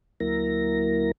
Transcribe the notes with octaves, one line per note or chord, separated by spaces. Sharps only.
D2 F#3 A#3 E4 A#4 A#6